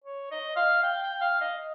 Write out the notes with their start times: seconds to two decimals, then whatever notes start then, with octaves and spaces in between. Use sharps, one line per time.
0.04 C#5
0.31 D#5
0.56 F5
0.83 G5
1.02 G5
1.21 F5
1.41 D#5